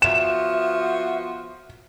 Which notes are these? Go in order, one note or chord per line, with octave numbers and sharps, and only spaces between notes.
F3 B3 F#4 E5 E7